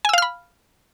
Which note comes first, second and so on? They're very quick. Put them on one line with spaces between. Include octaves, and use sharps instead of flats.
G#5 E6 F5 F6 B5